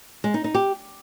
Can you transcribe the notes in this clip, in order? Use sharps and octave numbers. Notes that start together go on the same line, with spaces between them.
G#3
D#4
D#4
G4